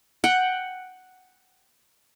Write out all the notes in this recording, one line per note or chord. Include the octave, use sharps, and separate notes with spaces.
F#5 G5